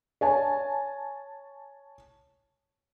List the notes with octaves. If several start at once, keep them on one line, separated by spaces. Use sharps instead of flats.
C#5 G#5 A5